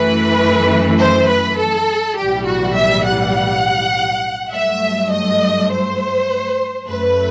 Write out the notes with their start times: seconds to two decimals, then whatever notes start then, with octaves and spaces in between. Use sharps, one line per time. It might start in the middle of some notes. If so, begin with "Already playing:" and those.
Already playing: F#2 E3 A3 B4
0.99 C5
1.28 B4
1.58 A4
2.17 B1 A2 E3 G3 G4
2.46 F#4
2.76 E5
3.05 F#5
4.52 G2 F#3 A3 E5
5.11 D#5
5.70 C5
6.88 F#2 F#3 A3 B4